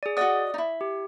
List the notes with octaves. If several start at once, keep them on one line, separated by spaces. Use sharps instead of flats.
G#4 D5
F#4 D5 D#5 F#5 D#6
D#4 E4
G4